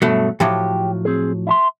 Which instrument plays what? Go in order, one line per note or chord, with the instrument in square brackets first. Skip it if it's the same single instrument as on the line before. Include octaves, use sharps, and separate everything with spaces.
[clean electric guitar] G2 B2 [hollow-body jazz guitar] F#3 A3
[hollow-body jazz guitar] A2 F3 F#3 [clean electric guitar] G4
[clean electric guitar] C4 G#4
E4 E5 C6